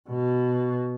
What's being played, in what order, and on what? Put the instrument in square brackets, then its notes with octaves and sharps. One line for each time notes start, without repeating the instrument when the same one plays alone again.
[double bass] B2